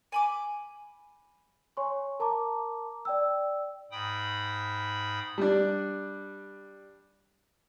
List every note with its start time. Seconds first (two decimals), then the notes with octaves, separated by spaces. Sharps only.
0.12 G#5 B5 D6
1.77 C#5 G#5 C6 C#6
2.20 A#4 A5 A#5 D6
3.05 D5 G5 E6
3.92 G#2 G5 B5 D#6
5.38 G3 D4